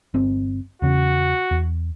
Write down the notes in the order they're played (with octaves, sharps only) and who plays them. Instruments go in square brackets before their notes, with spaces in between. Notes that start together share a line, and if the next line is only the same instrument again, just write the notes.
[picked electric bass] G1 C4
[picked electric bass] E2 C#3 [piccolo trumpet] F#4
[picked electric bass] E2